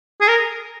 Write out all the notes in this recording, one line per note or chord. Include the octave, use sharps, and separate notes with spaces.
G#4
A#4